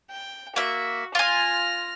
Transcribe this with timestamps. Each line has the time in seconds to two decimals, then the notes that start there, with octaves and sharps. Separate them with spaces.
0.11 G5
0.56 A#3 F#4 E5
1.15 F4 G#5 F6 A#6